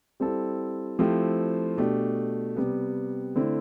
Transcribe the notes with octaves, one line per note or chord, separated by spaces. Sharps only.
G3 C4 E4 A4
F3 A3 C4 E4 G4
B2 A3 D4 G4
C3 G3 B3
D3 A3 C4 E4